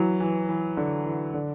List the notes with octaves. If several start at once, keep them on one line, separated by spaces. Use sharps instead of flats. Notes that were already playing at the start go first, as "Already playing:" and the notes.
Already playing: E3 F#3 E4
E3
E3
D3
E3
D3